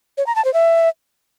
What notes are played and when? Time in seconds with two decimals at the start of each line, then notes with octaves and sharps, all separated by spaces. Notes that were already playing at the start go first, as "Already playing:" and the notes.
0.18 C#5
0.27 A#5
0.36 A5
0.45 C5
0.54 E5